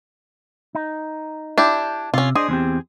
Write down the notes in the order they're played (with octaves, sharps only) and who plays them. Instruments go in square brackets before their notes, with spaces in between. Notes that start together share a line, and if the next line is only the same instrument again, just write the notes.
[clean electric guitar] D#4
[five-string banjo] D4 E4 G4
[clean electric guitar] C3 [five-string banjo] C#4 F4
[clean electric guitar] D4 C5 D#5 [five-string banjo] G#4
[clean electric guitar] E2 C4 G4